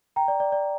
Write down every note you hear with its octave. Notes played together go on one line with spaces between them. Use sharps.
G5 A#5
D5
D5
D5